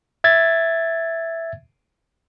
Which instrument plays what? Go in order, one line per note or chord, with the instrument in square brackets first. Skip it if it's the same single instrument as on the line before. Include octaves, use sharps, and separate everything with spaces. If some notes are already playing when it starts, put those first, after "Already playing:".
[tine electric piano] E5 G#6 A6